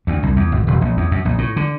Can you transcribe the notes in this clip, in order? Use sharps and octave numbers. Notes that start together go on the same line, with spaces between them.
D2
C2
E2
G#1
E1
A#1
E2
F#2
A#1
A2
D3